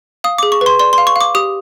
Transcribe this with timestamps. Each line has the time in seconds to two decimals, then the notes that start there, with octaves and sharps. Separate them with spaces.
0.24 F5 D#6
0.38 G#4 D6
0.52 C#6
0.61 B4
0.66 C6
0.80 D5 C6
0.93 C6
0.98 F5
1.07 C#6
1.16 F5 D6
1.35 G4 D#6